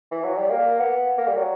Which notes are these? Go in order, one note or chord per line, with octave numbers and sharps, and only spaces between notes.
E3
F#3
G3
A#3
B3
A#3
G3
F#3